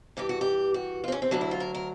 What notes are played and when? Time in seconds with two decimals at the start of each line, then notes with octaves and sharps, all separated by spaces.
0.17 G2 E3 G4
0.29 F#4
0.41 G4
0.74 F#4
1.04 F4
1.08 C4
1.12 C#4
1.22 C4
1.31 D2 D3 F#3 D4
1.41 E4
1.51 F4
1.60 A#4
1.75 A#4